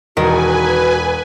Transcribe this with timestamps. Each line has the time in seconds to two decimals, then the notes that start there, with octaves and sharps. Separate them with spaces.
0.17 E1 D#3 F#4 A#4 B4 G#5